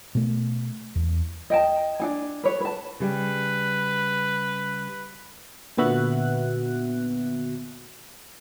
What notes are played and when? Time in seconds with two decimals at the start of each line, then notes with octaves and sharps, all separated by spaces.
0.15 B2 A3
0.95 E2
1.50 D#5 G5 A5
2.00 D4 D#4 G#5
2.43 B4 C#5
2.61 B4 A5
3.00 C#3 G3 B4
5.77 A#2 D3 B3 F#4 E5 F#6